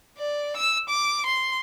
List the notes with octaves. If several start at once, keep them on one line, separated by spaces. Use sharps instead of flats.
D5
E6
D6
C6